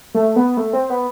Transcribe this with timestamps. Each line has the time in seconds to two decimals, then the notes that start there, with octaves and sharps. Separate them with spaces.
0.15 A3
0.36 B3
0.57 A3
0.73 C4
0.90 B3